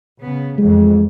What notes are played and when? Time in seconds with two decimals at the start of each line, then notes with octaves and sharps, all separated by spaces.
0.20 C#3 B3
0.58 A1 F2 G#3